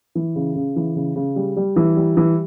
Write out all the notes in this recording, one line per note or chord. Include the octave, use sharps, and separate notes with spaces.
E3
C#3
C#3
E3
C#3
C#3
G3
G3
E3
G3
E3